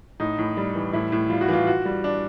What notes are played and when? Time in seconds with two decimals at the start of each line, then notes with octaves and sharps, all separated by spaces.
0.20 A2 D#4
0.38 A2
0.57 G3
0.75 E3
0.93 A2 E4
1.12 A2
1.30 G3 F4
1.41 F#4
1.48 E3 F4
1.67 F4 F#4
1.85 G3
2.04 D4